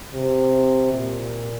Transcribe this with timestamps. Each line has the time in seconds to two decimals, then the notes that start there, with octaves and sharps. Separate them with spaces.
0.14 C3
0.93 A#2